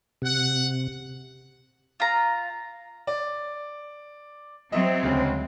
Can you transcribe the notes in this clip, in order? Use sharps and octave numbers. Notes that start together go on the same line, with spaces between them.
C3 F#5
F4 A#5
D5
F#3 C4 D#5 E5
D2 C#3 G#3